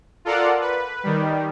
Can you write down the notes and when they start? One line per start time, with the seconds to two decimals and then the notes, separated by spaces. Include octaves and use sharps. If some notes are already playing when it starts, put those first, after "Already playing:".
0.25 F4 A4 A#4 D5 F#5
0.61 B4
1.03 D#3 G3